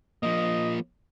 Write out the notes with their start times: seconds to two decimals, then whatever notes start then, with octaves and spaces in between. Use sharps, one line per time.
0.23 F3 A#3 D#5